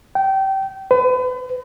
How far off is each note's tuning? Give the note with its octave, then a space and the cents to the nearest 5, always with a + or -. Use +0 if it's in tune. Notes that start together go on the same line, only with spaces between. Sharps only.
G5 -25
B4 +40